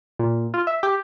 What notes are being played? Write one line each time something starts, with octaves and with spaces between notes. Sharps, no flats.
A#2
F4
E5
G4